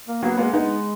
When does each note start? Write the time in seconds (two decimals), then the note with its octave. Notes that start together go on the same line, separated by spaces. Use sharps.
0.08 A#3
0.22 F#3 A#3 B3
0.38 G#3 A#3 B3
0.53 G#3 B3 D#4